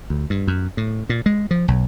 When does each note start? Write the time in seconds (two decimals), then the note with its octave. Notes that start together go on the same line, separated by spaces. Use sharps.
0.10 D2
0.30 G2
0.48 F#2
0.77 A2
1.09 A#2
1.26 G#3
1.51 F3
1.68 B1